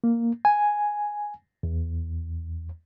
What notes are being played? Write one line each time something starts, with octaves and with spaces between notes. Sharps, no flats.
A#3
G#5
E2